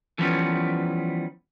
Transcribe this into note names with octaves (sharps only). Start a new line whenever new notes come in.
D3 E3 F3 G3 B3 C#4